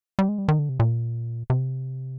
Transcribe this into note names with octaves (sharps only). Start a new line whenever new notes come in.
G3
G#3
G3
D#3
D3
C3
A#2
C3